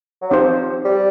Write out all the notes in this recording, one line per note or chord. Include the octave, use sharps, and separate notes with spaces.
F#3
F3 C4 D#4 G4 C5
G3